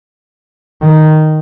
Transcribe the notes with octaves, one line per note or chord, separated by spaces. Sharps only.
D#3